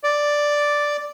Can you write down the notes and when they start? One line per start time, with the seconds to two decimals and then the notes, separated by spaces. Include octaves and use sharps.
0.04 D5